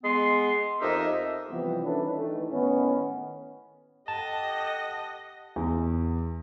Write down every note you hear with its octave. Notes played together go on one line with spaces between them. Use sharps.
G#3 B3 C6
F2 D#4 G4 A#4 D#5 E5
C3 E3 F3 G3 B3
D#3 E3 C#4 D4 A4 B4
D#3 E3 A3
A2 D#3 B3 C#4
G4 A4 D#5 F#5 A5
E2